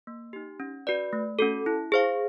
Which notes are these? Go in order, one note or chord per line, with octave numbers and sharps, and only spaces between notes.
A#3
D#4 G4
C#4
F#4 B4 D5
A3
C#4 F#4 A4
E4
G#4 C5 F5